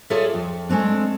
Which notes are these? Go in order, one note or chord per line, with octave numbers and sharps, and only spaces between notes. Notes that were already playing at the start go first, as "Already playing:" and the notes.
F4 G#4 A4 C#5 D5 E5
F2
G#3 A3 C4 D4